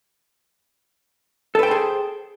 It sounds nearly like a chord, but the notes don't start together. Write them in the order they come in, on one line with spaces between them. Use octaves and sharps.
A4 B4 G5 C5 G#4